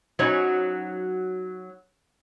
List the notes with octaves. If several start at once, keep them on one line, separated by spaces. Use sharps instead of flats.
F#3 C#4 D#4